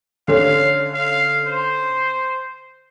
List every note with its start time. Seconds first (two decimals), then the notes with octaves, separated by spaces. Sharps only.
0.28 D3 C#4 F5
0.94 F5
1.47 C5